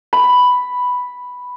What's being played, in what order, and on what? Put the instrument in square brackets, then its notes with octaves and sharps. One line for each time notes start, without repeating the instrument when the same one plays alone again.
[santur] B5